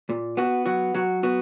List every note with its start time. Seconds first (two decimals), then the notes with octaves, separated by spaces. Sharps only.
0.09 A#2
0.37 B3 F#4
0.66 F#3 F#4
0.95 F#3 F#4
1.23 B3 F#4